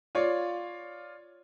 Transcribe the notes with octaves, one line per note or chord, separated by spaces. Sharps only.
F4 C#5 D5 F5